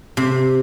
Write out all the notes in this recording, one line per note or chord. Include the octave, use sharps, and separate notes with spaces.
C3